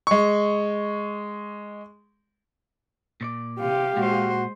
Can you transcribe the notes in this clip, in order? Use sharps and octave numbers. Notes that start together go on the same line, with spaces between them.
G#3 C#6
A#2 C#5 D5
C3 G4 F5
A#2 G#3 F#4 C5